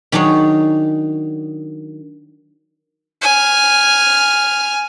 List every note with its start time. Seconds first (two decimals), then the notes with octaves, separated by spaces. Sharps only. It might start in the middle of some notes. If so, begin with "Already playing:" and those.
0.12 D#3 F#3 D4 G#4 C#5
3.22 G#5 F6